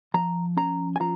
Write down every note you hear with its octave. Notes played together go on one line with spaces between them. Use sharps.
F3 A#5
C#4 A#5
G#5
F3 A#5